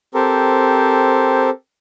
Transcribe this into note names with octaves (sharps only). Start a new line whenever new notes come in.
C4 G4 A4 A#4 C5